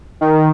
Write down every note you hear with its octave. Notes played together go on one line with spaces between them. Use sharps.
D#3